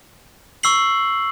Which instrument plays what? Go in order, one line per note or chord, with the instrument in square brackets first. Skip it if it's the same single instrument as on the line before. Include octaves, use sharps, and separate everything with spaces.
[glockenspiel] C#6 E6 C7 F#7